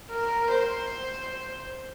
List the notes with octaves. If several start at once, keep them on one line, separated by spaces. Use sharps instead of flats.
A#4
C5